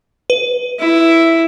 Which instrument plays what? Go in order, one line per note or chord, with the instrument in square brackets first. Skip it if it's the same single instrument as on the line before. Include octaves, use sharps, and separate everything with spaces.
[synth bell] B4
[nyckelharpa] E4